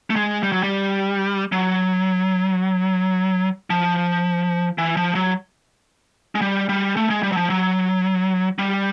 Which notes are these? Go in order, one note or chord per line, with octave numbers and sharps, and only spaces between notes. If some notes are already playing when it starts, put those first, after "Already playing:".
A3
G#3
G3
F#3
G3
F#3
F3
E3
F3
F#3
G#3
G3
G3
A3
G#3
G3
F#3
F3
F#3
G3